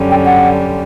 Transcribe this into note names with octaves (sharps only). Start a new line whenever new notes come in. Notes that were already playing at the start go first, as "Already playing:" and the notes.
Already playing: F#2 D3 G3 C#4
G5
F#5